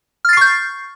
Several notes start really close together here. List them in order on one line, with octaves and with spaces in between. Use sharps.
F6 A6 C7 C#6 G6